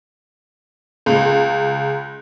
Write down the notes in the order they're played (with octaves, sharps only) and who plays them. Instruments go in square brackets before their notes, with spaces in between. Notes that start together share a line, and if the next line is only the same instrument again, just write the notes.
[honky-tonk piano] C#2